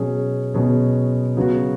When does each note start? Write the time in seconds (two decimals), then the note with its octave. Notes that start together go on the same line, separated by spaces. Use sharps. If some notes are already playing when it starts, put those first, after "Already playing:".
Already playing: B2 F#3 C#4 G#4
0.54 B2 F#3 C#4 G#4
1.37 C#3 F#3 B3 F#4